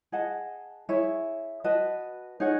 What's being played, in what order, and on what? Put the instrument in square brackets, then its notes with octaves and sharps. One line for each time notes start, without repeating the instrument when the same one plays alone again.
[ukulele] G#4 D#5 F#5 A5
E4 G#4 C#5 E5
F#4 B4 D#5 A5
D#4 G#4 C#5 F#5